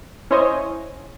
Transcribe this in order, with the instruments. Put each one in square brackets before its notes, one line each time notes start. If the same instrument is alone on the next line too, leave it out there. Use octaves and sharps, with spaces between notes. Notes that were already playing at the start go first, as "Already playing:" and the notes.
[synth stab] C#4 E4 C5 C#5 D#5 G#5